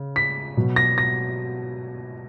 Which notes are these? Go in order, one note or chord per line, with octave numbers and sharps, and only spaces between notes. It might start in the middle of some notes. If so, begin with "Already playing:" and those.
Already playing: C#3
B6
B2 F#3
A#6
A#6